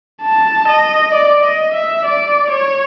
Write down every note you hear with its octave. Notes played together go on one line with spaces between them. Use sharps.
A5
D#5
D5
D#5
E5
D5
C#5